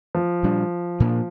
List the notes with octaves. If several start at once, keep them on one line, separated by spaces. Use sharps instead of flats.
F3
A#2 G3 D4
A#2 A#3 D4